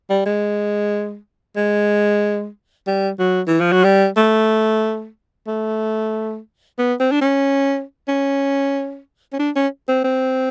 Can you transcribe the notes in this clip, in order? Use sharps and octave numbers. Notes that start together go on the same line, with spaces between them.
G3
G#3
G#3
G3
F#3
E3
F3
F#3
G3
A3
A3
B3
C4
D4
C#4
C#4
C#4
D4
C#4
C4
C4